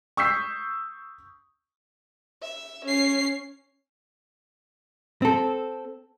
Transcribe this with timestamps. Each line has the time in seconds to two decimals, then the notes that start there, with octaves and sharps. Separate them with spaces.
0.17 C#6 D#6 E6 G6 B6 C7
2.42 E5
2.85 C#4 C7
5.22 C4 A4